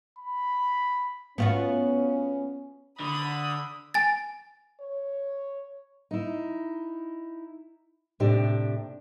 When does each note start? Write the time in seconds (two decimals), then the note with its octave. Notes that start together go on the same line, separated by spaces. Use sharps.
0.19 B5
1.38 B3 C#4 F4 F#4
3.00 D3 B5 D#6
3.94 G#5 A6
4.80 C#5
6.11 D#4 E4
8.20 A2 C3 D4 G4